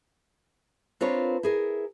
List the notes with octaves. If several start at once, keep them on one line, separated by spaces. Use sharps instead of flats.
C4 D4 F4 A#4 B4 C#5
E4 G#4 A#4